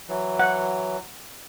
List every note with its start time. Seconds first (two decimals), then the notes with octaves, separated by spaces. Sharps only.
0.09 E3 F#3
0.39 F#5